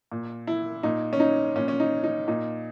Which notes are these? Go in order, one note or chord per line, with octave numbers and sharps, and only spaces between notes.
A#2
E4
A#2 D#4
C#4
D#4
A#2 C#4
C#4
D#4
D#4
A#2 D#4